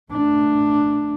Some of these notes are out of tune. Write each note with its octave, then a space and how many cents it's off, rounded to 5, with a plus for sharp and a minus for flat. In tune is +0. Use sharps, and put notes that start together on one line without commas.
A3 +0 D4 +0